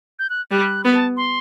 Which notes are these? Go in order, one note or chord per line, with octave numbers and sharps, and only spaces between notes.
G6
F#6
G3 F#6
B3 B5
A5
C6